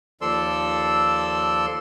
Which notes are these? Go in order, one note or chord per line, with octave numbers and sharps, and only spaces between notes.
D#2 F3 A4 D5 C6 E6